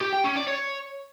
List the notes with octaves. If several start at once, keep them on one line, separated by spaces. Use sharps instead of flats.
G4
G5
C#4
D5
C#5